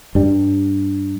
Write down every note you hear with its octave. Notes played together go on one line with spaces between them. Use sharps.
G2 G3